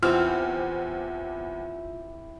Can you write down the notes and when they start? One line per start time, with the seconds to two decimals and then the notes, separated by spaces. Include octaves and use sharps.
0.03 E2 C4 E4 F4 G4 F6